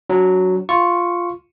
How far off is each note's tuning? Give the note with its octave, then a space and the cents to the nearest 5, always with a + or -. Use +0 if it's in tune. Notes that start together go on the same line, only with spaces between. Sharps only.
F#3 +0 D4 -30
F4 +0 C#6 +0